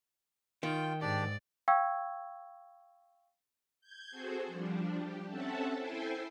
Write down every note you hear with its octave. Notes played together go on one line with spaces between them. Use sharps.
D#3 F4 G5
G#2 D4 G4 D5
F5 G5 C#6 E6 G#6
G6 G#6
C4 F#4 G#4 A4 C5
F3 G3 D4
G4
C4 C#4 A4 E5 F#5 A5
E4 A4 C5 G5 G#5 C6